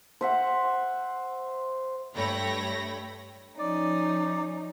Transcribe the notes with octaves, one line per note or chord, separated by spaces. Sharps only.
C5 E5 F#5
G2 A3 C#5 G5 B5 A#6
F3 C#4 D#4 D5